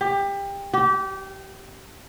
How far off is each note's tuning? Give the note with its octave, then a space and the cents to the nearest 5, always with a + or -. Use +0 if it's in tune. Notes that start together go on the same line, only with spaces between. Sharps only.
G4 +25
G4 -25